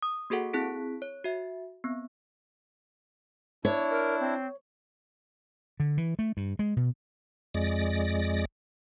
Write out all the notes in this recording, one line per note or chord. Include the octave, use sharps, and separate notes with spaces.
D#6
A#3 F#4 G#4 A4 F#5
C4 E4 G#4 F#6 B6 D7
C#5
F#4 E5
B3 C4
D4 E4 C#5
A#4
C4
D3
E3
A3
G2
G#3
B2
F2 G#3 D5 A#6